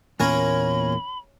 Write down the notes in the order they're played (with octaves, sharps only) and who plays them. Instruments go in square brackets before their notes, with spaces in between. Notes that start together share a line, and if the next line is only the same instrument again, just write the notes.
[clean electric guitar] E2 A#2 A#3 [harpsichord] C#4 A#4 C#5 [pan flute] B5